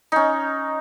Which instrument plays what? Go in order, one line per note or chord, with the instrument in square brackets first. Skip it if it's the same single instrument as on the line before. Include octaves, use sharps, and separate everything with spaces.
[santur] C#4 D#4